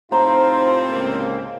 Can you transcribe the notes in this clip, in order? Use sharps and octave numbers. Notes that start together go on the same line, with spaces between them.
A2 C3 C4 D#4 F4 C5 A#5
C#2 A#3